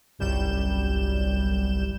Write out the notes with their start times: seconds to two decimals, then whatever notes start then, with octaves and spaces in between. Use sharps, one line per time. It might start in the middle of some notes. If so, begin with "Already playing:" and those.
0.19 G1 C2 F#2 G3 G6 E7